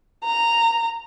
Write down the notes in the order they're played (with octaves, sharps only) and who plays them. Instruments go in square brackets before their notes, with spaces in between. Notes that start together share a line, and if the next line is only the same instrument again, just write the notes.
[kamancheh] A#5